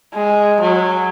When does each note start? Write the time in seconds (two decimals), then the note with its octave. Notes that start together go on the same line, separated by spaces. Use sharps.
0.14 G#3
0.61 F#3